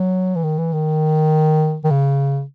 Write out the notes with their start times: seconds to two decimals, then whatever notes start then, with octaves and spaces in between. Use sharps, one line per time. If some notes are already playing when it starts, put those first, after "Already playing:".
Already playing: F#3
0.36 E3
0.44 D#3
0.58 E3
0.73 D#3
1.84 D#3
1.91 C#3